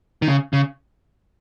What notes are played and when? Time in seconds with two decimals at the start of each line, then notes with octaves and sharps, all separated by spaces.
0.22 D#3
0.28 C#3
0.53 C#3